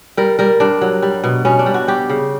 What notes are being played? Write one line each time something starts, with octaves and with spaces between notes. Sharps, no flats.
G3 A#4
G3 A#4
G2 D4
F#3
G3
B2
B2 C#4
D4
G3
F#4
G3 G4
C#3